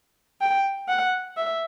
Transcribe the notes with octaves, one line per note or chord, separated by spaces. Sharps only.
G5
F#5
E5